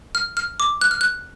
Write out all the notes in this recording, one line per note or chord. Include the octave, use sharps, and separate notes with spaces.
F6
F6
D6
F#6
F6
F#6